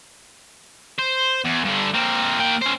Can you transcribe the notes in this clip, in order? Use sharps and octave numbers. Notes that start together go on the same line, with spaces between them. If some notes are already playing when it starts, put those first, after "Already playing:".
C5
E2
G2 D3
A#3 C4
A#3 G5
C#4 C5